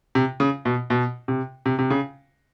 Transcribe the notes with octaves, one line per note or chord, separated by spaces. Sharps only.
C3
C#3
B2
B2
C3
C3
C3
C#3